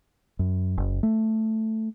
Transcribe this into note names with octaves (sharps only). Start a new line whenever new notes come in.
F#2
F#1
A3